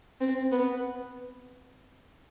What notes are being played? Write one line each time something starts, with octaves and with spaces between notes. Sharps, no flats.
C4
B3